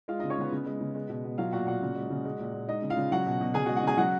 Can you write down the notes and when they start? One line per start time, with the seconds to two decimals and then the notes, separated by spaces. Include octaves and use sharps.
0.08 G#3 F4 F5
0.19 C#3 D#4 D#5
0.30 C#4 C#5
0.38 C#3 B3 B4
0.52 C#3
0.66 G#3
0.80 C#3
0.95 G#3
1.09 B2
1.24 B2
1.38 F#3 F4 F5
1.52 A#2 F#4 F#5
1.67 A#2 F#4 F#5
1.81 C#3
1.95 G#3
2.10 C#3
2.25 G#3
2.39 A#2
2.53 A#2
2.68 G#3 D#4 D#5
2.82 C#3
2.90 F4 F5
2.97 C#3
3.12 F#3 F#4 F#5
3.26 B2
3.41 B2
3.54 C#3 G#4 G#5
3.66 F#4 F#5
3.69 G#3
3.77 F#4 F#5
3.83 C#3 G#4 G#5
3.97 F#3 F#4 F#5